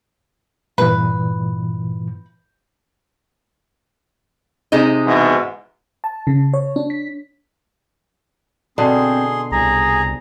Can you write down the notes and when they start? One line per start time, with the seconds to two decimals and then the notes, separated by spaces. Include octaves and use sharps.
0.78 G2 A#2 E3 B4
4.72 C3 G#3 D#4
5.06 G#2 B2 E3
6.04 A5
6.27 C#3
6.54 C#5
6.76 D4
6.90 B6
8.78 B2 D3 C4 G#4 C6
9.52 C2 G#4 A#5